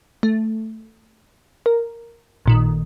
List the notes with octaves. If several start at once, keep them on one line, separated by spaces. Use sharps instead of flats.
A3
A#4
A1 A#2 D#3